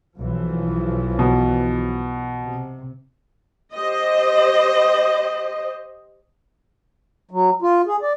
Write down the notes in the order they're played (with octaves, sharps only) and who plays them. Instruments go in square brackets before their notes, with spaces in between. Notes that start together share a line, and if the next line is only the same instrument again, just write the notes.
[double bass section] B1 E3 F3
[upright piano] B2
[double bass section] C3
[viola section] G4 C5 D#5
[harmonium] F#3
F4
G#4
D5